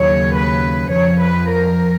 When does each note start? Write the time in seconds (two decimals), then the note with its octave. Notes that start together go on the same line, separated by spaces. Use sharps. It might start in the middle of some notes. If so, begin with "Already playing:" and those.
Already playing: D#2 C#3 F#3 C#5
0.36 B4
0.93 F2 F3 C#5
1.21 B4
1.49 A#4